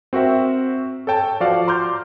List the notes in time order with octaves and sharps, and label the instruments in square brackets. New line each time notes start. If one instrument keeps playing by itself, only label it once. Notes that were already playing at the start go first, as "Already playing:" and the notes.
[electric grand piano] C4 F#4 A#4 E5 G5
A4 C#5 G5 A5
F3 F#4 D5 F5
A#5 C6 D6 F6 G6